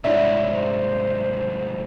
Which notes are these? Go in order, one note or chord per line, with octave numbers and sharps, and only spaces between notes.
C2 G#2 D4 E4 C#5 E5
C5